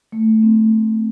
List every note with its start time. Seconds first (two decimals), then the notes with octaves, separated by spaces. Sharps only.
0.12 A3
0.43 C4
0.71 A3